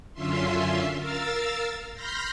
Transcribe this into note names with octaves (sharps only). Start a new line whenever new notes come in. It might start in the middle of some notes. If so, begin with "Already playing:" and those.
F#2 D3 C#4 F4 E5 C6
A#4 F5 E6 A6
B5 C6 F6 G6 A#6